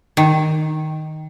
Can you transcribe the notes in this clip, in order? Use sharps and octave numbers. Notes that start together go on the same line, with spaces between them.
D#3